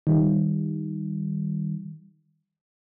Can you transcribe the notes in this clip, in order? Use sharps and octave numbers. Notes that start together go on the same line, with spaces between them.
D#3 G3